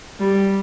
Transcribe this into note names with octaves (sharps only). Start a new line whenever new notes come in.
G3